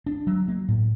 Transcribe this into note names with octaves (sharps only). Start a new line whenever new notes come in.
D4
F#3
A#3
A2